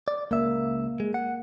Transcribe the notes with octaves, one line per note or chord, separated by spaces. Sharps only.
D5
C#2 A#3 E5
G#3
F#5